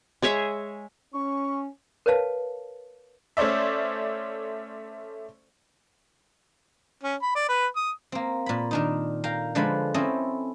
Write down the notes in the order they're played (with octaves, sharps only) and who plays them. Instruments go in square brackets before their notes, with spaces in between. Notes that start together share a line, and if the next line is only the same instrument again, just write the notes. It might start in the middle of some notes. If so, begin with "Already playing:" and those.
[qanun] G#3 G#4 C#5 E5
[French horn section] C#4 [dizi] C#6
[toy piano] A#4 B4 C#5 F5 A5
[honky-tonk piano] A3 C#4 C5 D5 E5
[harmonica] C#4
B5
D5
B4
D#6
[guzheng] A#3 C4
A#2 B5
D#3 D4 D#4
A#4 F5 G5
D3 F3 G#3 B4 A5 B5
C4 C#4 E4 A4 D#5